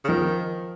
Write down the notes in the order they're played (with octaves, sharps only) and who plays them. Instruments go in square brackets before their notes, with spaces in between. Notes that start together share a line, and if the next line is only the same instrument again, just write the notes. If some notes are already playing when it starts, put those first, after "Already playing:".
[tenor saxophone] C#3
[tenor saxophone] D#3 [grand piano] F3